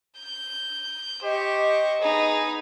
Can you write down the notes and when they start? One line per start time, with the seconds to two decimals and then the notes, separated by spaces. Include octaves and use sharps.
0.20 G6
1.24 G4 C5 D#5 C#6
2.02 B3 D#4 G#4 B5